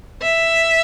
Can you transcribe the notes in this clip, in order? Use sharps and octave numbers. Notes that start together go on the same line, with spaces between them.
E5